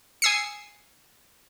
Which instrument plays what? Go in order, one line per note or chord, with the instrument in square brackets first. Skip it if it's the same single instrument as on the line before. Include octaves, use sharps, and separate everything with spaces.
[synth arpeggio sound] G#5 D#6 E6 C7 C#7